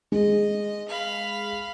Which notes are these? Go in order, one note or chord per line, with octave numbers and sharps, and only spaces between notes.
G#3 D#5
F5 B5